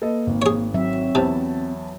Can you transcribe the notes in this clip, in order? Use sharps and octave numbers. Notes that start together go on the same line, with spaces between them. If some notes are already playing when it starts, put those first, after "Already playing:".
A#3 A4 B4 D#5
G#1
G#4 C#5
F#3 C4 E5
E2 C3 E4 A5